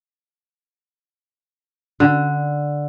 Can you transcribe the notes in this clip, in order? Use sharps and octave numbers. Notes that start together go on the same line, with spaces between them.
D3